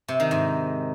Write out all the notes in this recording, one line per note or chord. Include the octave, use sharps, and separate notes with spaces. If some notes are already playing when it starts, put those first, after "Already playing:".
C3
D#3
G#2